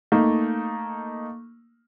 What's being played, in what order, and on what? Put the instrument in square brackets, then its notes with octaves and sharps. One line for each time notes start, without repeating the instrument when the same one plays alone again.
[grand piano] A3 A#3 D#4